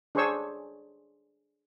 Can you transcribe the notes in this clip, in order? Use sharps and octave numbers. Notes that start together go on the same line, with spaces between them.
D4 G#4 C5 C#5 C#6 E6